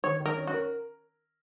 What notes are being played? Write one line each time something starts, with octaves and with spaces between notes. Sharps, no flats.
D#3 C#5
D#3
A#4
C#4
F#4
A#4